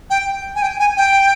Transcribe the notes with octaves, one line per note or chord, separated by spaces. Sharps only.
G5
G#5
G5
G#5
G5